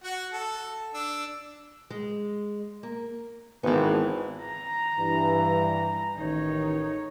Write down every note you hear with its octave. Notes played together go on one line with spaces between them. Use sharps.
F#4 F#5
A4
D4 E6
G#3
A#3
G#1 E3 B3
A#5
G2 E3
A1 D#3 D#4 C#5